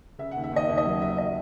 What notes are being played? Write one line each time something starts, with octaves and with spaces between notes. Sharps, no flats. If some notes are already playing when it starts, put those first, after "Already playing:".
C#3 E5
D#2 F#5
E5
D#2 D#5
D#2 E5
D#5
F#3 E5
D#2 E5
D#5